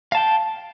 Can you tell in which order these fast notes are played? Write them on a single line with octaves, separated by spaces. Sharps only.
F5 A5 G5